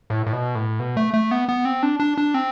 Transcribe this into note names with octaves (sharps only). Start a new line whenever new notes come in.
A2
A2
B2
A2
B2
A3
A3
B3
B3
C4
D4
D4
D4
C4